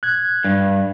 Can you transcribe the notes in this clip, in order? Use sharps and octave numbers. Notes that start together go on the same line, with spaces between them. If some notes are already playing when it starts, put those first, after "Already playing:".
F#6 G#6
G2